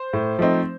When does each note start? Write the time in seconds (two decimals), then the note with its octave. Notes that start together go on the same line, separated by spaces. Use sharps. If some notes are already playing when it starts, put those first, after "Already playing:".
Already playing: C5
0.13 A2
0.39 F3 A3 C4 D#4